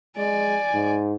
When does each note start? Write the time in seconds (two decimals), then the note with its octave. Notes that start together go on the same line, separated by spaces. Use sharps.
0.17 G#3 D5 G#5
0.73 G#2